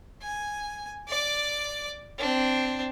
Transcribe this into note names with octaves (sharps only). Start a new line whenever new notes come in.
G#5
D5 D6
C4 D4